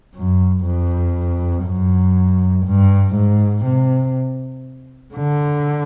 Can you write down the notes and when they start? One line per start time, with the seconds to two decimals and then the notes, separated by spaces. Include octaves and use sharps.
0.15 F#2
0.65 F2
1.65 F#2
2.66 G2
3.16 G#2
3.65 C3
5.15 D3